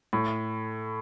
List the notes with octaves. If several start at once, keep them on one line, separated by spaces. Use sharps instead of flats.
A2